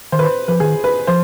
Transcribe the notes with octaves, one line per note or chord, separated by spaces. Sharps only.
D#3 C5
B4
C5
F3 B4
D#3 G#4
B4
F3 C5